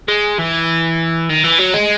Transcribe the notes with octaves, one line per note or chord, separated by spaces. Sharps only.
G#3
E3
D#3
E3
F#3
G#3